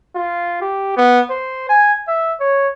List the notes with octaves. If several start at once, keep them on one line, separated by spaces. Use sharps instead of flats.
F4
G4
B3
C5
G#5
E5
C#5